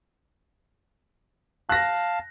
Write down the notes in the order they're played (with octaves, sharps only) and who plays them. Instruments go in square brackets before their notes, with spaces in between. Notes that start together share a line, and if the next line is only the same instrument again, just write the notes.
[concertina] F5 A5 [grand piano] F#6 A#6